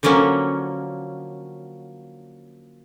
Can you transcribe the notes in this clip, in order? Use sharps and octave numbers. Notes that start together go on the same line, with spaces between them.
D3 F3 F#3 A#3 C#4